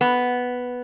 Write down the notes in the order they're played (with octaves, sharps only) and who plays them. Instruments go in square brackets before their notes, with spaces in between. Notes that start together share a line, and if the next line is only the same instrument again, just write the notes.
[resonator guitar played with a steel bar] B3